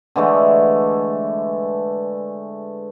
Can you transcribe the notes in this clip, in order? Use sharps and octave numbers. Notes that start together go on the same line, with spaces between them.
D3 E3 G#3 A3